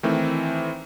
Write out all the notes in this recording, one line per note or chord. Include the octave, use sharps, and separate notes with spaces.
D#3 E3 A3 C4